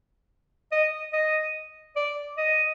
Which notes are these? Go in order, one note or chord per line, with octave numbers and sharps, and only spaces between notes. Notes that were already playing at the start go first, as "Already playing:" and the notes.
D#5
D#5
D5
D#5